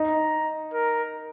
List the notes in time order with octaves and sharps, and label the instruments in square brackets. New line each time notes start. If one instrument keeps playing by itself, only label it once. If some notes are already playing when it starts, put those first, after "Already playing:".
Already playing: [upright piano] D#4 [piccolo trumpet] A#5
[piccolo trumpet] A#4